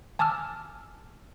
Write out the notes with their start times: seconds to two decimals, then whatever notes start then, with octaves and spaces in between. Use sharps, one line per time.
0.19 G#5 A5 D6 E6 F6